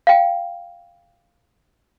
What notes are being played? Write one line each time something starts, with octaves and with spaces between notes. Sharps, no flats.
F5 G5